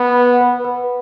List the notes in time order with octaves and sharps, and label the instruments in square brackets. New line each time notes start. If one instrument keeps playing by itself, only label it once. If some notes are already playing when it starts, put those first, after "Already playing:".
Already playing: [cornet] B3 [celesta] B5
[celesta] F#5
B4
B4